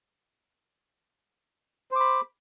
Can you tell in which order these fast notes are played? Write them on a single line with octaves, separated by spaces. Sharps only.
C5 D6 B5